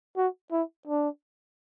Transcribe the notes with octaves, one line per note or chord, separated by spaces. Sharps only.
F#4
E4
D4